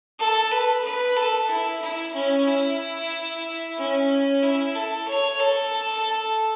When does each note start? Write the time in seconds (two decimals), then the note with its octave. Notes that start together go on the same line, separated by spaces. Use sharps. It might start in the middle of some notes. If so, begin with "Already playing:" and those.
0.20 A4
0.51 B4
0.84 B4
1.17 A4
1.50 E4
1.82 E4
2.15 C#4
2.48 E4
3.77 C#4
4.43 E4
4.75 A4
5.07 C#5
5.40 A4